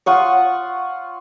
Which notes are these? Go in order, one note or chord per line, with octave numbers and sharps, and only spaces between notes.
F4 F#5 C#6 D#6